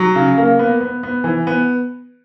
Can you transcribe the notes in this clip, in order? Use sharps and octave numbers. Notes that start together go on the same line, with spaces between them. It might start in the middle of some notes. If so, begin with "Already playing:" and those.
Already playing: F#3
C#3
A#3
B3
B3
B3
E3
B3